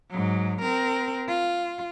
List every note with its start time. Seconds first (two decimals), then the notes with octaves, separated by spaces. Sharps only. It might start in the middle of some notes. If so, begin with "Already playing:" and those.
0.10 G#2 F#3
0.62 C4 A#4
1.28 F4